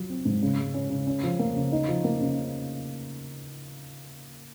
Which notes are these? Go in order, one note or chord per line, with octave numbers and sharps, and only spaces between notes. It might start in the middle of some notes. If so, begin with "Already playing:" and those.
Already playing: F#3 F4
C4
G#2
C#3
G#3
C#4
C#3
C#4
F3
A#3
C#3
D#4
F3
A#3
C#3